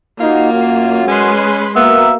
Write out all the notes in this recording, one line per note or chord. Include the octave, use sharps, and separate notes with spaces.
A#3 D#4 F4 F#4
F#2 F#4
G#3 C#4 B4 C6
A#3 B3 F#4 E5